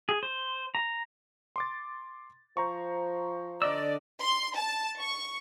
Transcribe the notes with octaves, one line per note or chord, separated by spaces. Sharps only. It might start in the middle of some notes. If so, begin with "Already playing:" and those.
G#4
C5
A#5
C6 D6 A6
F3 C5 A#5 C#6
D3 D5 D#5 E6
C6
A5
C#6